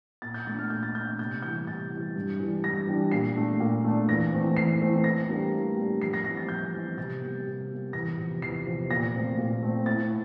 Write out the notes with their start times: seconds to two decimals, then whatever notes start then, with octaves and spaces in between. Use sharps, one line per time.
0.22 A#2 A6
0.34 G6
0.47 A3 D4 A6
0.59 F6
0.70 A#2 G6
0.83 A6
0.95 A3 D4 G6
1.19 C3 G6
1.42 E3 G3 G6
1.67 C3 A6
1.91 E3
1.96 G3
2.16 G2
2.40 E3 G3 D4
2.64 G2 A#6
2.87 E3 G3 D4
3.12 A#2 C7
3.36 A3 D4
3.60 A#2
3.84 A3 D4
4.09 E2 A#6
4.32 E3 A3 C4
4.56 E2 C7
4.80 E3 A3 C4
5.04 A2 A#6
5.29 G3 A#3 D4
5.53 A2
5.76 G3 A#3 D4
6.01 F2 C7
6.14 A#6
6.24 E3 G3 C4 A#6
6.37 A6
6.49 F2 G6
6.73 E3 G3 C4
6.97 C3 A6
7.21 G3 A#3
7.46 C3
7.70 G3 A#3
7.93 E2 A#6
8.18 C3 F3
8.42 E2 C7
8.66 C3 F3
8.90 A#2 A#6
9.14 A3 C4
9.38 A#2
9.63 A3 C4
9.86 A2 A6